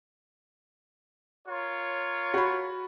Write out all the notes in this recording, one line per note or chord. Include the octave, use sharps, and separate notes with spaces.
F4 A#4 C#5
F#4 B5